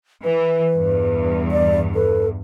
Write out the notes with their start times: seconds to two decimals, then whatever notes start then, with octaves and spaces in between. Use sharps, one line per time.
0.24 E3 B4
0.75 E2 G2
1.51 D5
1.95 A4 B4